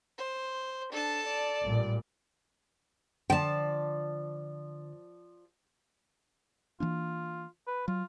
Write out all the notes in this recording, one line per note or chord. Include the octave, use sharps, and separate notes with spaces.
C5
D4 A4 A5
D5
A1 A#2 G3
D3 F3 D5 G5 A5
E3 A#3 D4 F4
B4
F#3 F4